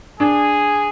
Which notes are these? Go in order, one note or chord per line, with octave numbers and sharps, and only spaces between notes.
D4 G#4